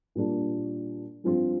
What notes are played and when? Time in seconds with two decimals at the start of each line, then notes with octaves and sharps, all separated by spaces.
0.15 A#2 G3 A#3 D4 F4
1.24 G2 F3 C4 F4